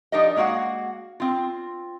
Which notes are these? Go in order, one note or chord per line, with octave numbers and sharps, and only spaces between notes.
F3 D4 D#4 G4 A#4 D#5
G#3 A#3 F#4 F5 F#5
C4 F4